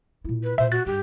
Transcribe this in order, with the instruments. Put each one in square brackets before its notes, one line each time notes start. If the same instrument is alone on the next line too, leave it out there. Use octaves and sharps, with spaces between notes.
[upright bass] A#2 E4
[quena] B4
[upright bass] A#2 [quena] C5 [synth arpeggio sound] E5
[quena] F#4 [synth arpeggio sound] F#6 A6
[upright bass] G2 [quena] G4